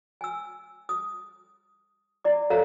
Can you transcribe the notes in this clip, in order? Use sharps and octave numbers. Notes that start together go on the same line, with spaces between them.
G#5 E6
D#6
E4 D5 D6
A4 A#4 C#5 E5 F5 A#5